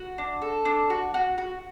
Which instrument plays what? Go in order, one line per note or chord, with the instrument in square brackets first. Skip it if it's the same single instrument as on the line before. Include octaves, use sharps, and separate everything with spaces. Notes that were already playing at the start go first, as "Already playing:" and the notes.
Already playing: [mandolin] F#4
D4
A4
D4
F#4
F#4
F#4